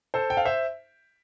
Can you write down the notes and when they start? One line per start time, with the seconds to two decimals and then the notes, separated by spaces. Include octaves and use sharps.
0.14 A4 C5
0.30 G5
0.37 F5
0.45 C5 E5